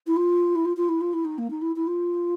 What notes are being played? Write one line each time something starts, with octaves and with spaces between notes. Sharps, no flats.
E4
F4
E4
F4
F4
E4
F4
E4
D#4
A#3
D#4
E4
E4
F4